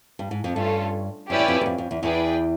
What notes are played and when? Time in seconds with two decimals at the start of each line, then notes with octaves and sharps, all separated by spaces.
0.19 G2
0.31 G#2
0.44 F2
0.55 G2 A3 C#4 F4 A4
1.29 F#2 C#4 E4 G4 B4 D5
1.39 E2
1.48 F2
1.61 F#2
1.66 F2
1.78 F2
1.91 E2
2.03 E2 G#4 B4 D5 G5